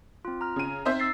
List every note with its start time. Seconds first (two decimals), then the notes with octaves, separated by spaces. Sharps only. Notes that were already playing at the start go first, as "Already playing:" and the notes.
0.25 C4 F4
0.41 A#5 F6
0.56 C#3 D#7
0.85 C4 D#4 C5 E5
1.00 E6 A6 C7